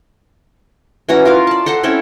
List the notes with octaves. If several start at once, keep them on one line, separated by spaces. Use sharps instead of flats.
E3 C#4 F#4 A#5
F4 A#4 F5
D5 A5
A4 C5 F#5 A#5
C4 C#4 E4 A4